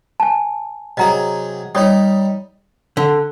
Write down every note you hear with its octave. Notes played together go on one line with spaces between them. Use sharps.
G#5 A5
C3 F#3 G#4 D#5 A#5
G3 D#4 C#5 D5 D#6
D3